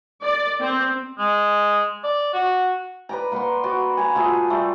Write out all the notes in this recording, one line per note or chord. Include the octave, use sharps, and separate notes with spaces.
D5
C4
G#3
D5
F#4
B4 D5 A#5
A#3 B4 F#5 C6
F#4 D5
G#5 A#5 B5
A3 F4 F#4 G#4
G3 A3